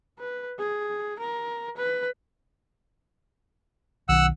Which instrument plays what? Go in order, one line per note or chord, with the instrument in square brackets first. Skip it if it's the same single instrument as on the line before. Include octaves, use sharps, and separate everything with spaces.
[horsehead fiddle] B4
G#4
A#4
B4
[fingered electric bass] B1 D#3 [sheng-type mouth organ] F#5 E6 F#6